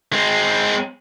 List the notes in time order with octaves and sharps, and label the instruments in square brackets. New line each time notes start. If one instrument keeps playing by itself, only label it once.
[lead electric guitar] G#3 C4